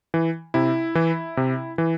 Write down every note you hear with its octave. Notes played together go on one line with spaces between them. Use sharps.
E3
C3 E4
E3
C3
E3